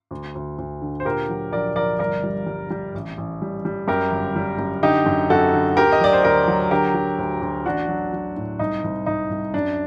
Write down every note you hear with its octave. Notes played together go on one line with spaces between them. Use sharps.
D2
D2
D2
D3
C5
A#2 G4 A#4
F#3
A#1 A#4 D5
A#1 A#4 D5
G1 A#4 D5
G3
G3
G3
A1
A1
G3
G3
F#2 G4 A#4
G1
G3
F#2
D3 D#4 G4
F#2
F#2 F#4 A4
D3
D2 G4 A#4
D#5
F#3 D5
C5
D2 G4 A#4
F#3
D3 G4 A#4
F#3
D2
D2
A1 D4 F#4
F#3
F#3
A2
C2 D#4
C2
C2 D#4
C2
F#2 D4